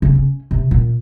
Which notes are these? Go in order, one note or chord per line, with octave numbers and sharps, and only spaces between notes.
C#3
C#4
C3
A#2